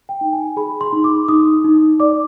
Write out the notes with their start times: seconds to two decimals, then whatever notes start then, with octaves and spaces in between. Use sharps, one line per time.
0.09 G5
0.21 D#4
0.33 G#5
0.57 G#4 B5
0.81 C6
0.93 D#4
1.04 D6
1.29 D#4 D#6
1.64 D#4
2.00 D5 D6